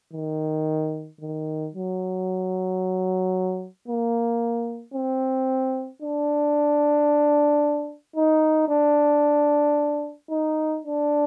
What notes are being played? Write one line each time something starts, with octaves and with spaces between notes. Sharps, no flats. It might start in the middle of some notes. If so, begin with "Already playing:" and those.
D#3
D#3
F#3
A#3
C4
D4
D#4
D4
D#4
D4